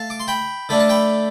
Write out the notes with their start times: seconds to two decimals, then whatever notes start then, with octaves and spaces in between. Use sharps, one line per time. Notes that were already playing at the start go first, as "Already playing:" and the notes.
Already playing: A3 F5 A5
0.10 D6
0.20 C6
0.28 G5 B5
0.69 D3 A3 D4 B5
0.80 A5
0.89 G5 B5